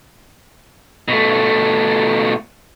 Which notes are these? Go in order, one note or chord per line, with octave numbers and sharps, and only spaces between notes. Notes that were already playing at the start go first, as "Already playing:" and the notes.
B2 A3